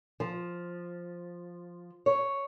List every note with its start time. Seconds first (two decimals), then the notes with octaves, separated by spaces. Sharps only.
0.20 F3
2.06 C#5